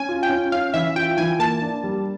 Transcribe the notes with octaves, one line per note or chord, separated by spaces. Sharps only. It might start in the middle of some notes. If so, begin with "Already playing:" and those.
Already playing: C#4 G#5
F4
G5
C#4
C#4 F5
E3 E5
F4 G5
E3 G#5
A#3 A5
D4
G3